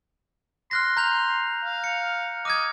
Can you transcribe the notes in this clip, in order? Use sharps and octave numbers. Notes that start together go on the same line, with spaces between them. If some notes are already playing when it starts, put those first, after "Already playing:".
C6 F6 F#6 A#6
A#5 G6 F7
F5
C#7
D#5 D6 F6 G#6